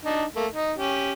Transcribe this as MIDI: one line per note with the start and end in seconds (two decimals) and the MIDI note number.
0.05 0.24 62
0.05 0.24 63
0.35 0.47 57
0.35 0.47 58
0.52 0.72 63
0.78 1.12 61
0.78 1.12 67